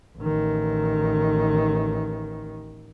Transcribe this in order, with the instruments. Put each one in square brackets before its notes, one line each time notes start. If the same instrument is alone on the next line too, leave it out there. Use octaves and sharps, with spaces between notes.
[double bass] A1 D#3